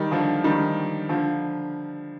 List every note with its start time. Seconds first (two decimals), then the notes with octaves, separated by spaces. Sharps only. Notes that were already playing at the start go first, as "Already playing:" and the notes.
Already playing: D#3 G3
0.11 D3 F3
0.44 D#3 G3
1.09 D3 F3